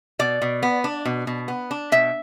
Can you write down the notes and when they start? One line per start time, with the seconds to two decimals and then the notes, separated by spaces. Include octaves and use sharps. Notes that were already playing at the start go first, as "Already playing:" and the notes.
0.19 B2 D5
0.42 B2
0.63 B3
0.84 D4
1.05 B2
1.27 B2
1.48 B3
1.71 D4
1.92 B2 E5